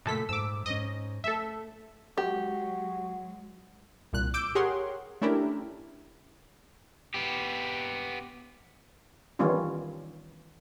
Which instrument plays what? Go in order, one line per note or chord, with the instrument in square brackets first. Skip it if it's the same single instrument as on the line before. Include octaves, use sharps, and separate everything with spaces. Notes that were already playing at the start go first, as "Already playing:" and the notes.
[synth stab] F#2 A4 B6 [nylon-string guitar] A#2 C#3 A3
[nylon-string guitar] G#2 [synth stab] D6 E6
[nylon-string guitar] G#2 C#4 [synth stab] D#5
[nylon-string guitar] A3 [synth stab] A4 E5
[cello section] F#3 G#3 [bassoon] F#4 [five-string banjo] G4
[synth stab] C2 A#2 F#6
D6 E6 G6 D7
G4 G#4 A#4 C#5 F#5 C6
A3 C#4 D4 E4 G4 A#4
[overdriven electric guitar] B3 G4
[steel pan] D#3 E3 G3 B3 C#4 F4